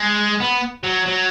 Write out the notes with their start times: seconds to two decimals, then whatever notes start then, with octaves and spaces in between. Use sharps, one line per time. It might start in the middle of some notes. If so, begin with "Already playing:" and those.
Already playing: G#3
0.40 B3
0.84 F#3
1.06 F#3